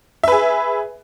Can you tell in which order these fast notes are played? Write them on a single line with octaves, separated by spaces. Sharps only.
E5 B4 G#4